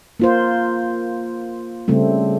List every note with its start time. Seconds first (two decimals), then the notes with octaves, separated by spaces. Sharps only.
0.20 A#3 F4 C5
1.88 C#3 G3 A3 C4